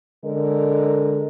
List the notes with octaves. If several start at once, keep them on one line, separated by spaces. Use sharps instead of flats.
D3 G#3 A#4